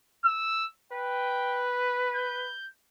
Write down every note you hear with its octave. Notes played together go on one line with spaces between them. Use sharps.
E6
B4 G5
G6